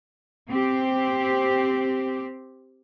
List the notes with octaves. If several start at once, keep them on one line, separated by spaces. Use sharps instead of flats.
C4 G4